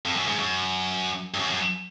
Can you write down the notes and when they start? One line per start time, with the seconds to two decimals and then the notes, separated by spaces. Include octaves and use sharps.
0.05 F2
0.16 F#2
0.27 G#2
0.39 F#2
1.34 G2
1.39 F#2
1.50 F#2